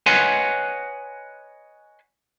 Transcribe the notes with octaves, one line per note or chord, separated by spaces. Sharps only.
B4 C#5 D#5 F#5 G#5 C6